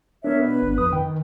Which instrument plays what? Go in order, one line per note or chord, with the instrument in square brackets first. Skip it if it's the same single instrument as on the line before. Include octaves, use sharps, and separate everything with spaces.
[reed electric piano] B3 D4 [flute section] A#4 C#5 E5
[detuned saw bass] B2 [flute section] B4
[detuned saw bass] G1
[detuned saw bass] F2 [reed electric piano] D#6
[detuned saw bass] D#3 [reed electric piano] G5